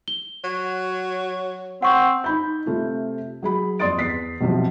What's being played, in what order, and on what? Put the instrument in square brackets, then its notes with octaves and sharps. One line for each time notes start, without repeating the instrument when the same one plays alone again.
[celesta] G7
[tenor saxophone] F#3
[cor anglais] C4 [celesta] F#5 C#6
[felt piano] D#4 B5 G6
C3 A3 F4
F#3 G#4 B5
F2 D5 C6 D#6 A6 D7
E2 B6 C7
B1 C3 E3 F3